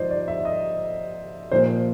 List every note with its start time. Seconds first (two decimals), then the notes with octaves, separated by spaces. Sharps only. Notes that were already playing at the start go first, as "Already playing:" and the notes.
Already playing: G#2 F3 C5 D5 D#5
0.10 D5
0.28 E5
0.45 D#5
1.51 A#2 F3 C5